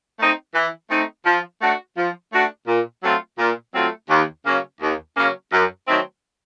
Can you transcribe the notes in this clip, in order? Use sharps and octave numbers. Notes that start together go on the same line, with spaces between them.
A3 C4 D#4
E3
A3 C4 D#4
F3
A3 D4 F#4
F3
A3 D4 F#4
A#2
F#3 A3 C4 F4
A#2
F#3 A3 C4 F4
D#2
C#3 F#3 A#3 C#4
D#2
C#3 F#3 A#3 C#4
F#2
D#3 F#3 A3 C4